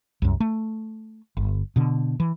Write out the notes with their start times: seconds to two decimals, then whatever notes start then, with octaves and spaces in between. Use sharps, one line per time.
0.22 C2 F#2
0.40 A3
1.37 G1
1.76 B2 D3
2.20 E3